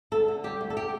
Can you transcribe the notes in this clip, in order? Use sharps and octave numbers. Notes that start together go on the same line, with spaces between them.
D2 A4
D3
G3 G4
D2
A4
G4